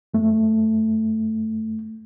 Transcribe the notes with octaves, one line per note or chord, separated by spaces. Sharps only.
F#2 A3